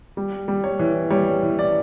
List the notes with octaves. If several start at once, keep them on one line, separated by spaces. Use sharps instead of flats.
G3
G3
C#5
E3
G3 C#5
E3
D5